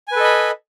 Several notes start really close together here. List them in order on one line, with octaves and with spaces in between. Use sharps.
G#5 B4 A4 D#5 B5